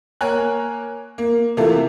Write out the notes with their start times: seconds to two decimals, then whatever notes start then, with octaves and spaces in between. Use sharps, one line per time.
0.21 A#3 A#4 C#5 G#5 F#6
1.18 A#3
1.57 C3 E3 A3 A#3 F4 A4